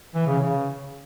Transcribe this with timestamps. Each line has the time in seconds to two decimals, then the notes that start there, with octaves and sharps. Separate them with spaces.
0.15 E3
0.27 C#3
0.38 C#3